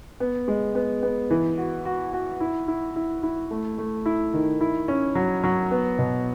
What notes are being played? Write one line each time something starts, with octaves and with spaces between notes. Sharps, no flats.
B3
G#3
B3
B3
E3
F#4
F#4
F#4
E4
E4
E4
E4
A3
A3
E4
D#3
E4
C#4
F#3
F#3
B3
B2